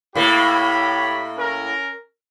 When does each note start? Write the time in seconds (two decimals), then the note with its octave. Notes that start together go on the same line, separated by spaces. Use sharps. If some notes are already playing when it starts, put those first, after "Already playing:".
0.15 A2 A#3 G4 C#5 B5
1.37 C#4 A#4